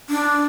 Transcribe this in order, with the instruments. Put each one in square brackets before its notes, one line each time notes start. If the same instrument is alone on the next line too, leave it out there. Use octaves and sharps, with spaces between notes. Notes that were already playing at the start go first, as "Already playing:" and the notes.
[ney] D4